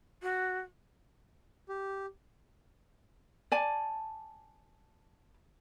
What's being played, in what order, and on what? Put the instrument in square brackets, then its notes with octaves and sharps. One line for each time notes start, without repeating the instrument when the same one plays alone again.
[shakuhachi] F#4
[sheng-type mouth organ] G4
[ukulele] D5 G#5 A5